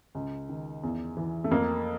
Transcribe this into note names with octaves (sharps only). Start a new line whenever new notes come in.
C#2
D#3
E2
E3
A3
F2 A#3